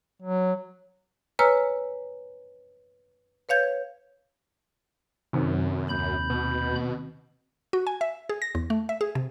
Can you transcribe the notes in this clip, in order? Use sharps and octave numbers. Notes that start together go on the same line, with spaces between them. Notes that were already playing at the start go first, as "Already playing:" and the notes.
F#3
B4 C#5 G#5 A#5 E6 F6
B4 C#5 F5 G6 G#6
F#2 C3 D#3 C4
D#2 B5 G6
B2
F#4
G#5
E5
G#4
A#6
E2
A3
E5
G#4
C3